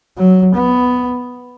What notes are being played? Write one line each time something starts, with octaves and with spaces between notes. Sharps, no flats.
F#3
B3